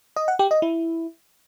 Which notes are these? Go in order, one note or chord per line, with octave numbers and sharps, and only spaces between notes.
D#5
F#5
G4
D#5
E4